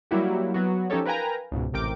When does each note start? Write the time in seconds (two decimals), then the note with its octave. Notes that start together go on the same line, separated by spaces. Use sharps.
0.11 F#3 G3 A#3 E4 F#4 G4
0.54 F#3 B3 F#4
0.90 F3 C#4 D#4 G4 A4 C#5
1.05 A#4 B4 F5 G5 G#5 A#5
1.52 C#2 G#2 B2
1.73 A1 C3 A#4 G5 D6 D7